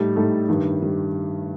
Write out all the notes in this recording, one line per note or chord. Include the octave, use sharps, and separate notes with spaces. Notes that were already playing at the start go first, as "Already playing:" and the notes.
Already playing: A2 G3 D#4 A4
A2 G3 D#4 A4
G2 D#3 G3
D#3 G3